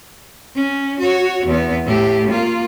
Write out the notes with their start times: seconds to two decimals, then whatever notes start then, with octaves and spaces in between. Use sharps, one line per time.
0.55 C#4
0.99 F#4 C#5
1.46 E2 B3
1.85 A2 G4
2.30 A#3 F4